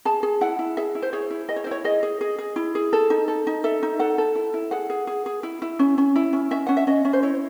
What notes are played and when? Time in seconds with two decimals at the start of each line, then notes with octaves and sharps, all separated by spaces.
0.05 G#4 A5
0.23 G#4
0.41 E4 F#5
0.59 E4
0.77 G#4 E5
0.95 E4
1.02 C5
1.13 G#4 C#5
1.31 E4
1.49 G#4 D#5
1.56 C#5
1.64 C5
1.67 E4 C#5
1.84 G#4 D#5
2.03 G#4
2.21 G#4
2.39 G#4
2.56 E4
2.75 G#4
2.93 A4
3.10 D#4
3.28 A4
3.47 D#4
3.64 A4 E5
3.83 D#4
3.99 A4 F#5
4.18 A4
4.35 E4
4.54 E4
4.71 G#4 F#5
4.90 G#4
5.07 G#4
5.26 G#4
5.43 E4
5.62 E4
5.79 C#4
5.98 C#4
6.16 E4
6.33 C#4
6.51 C#4 E5
6.67 C#4 F#5
6.77 E5
6.87 C#4 D#5
7.05 C#4
7.13 C5
7.23 E4 C#5